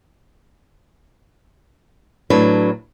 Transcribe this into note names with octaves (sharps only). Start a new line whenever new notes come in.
A2 F#3 D4 B4